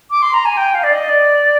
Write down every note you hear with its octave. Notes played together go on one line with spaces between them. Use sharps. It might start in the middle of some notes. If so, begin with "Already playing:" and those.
D6
C6
A#5
G#5
G5
F5
D5
D#5
D5